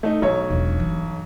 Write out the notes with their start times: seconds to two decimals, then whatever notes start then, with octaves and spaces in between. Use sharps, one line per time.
0.03 A3 D#4
0.22 B1 E4 C#5
0.50 E1 E4
0.80 G2 E3